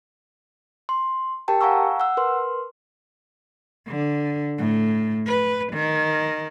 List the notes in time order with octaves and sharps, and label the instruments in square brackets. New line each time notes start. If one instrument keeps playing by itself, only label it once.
[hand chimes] C6
G4 A#4 G5 A5
F5 F#5 G#5 A#5 C#6 E6
F#5 E6
A#4 B4 C6
[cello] D3
A2
B4
D#3